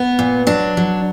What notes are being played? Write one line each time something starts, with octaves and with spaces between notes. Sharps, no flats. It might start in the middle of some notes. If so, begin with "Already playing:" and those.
Already playing: B3
A#2
F#3 D4
F#3